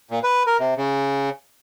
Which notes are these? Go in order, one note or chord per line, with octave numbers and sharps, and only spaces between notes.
A#2
B4
A#4
C3
C#3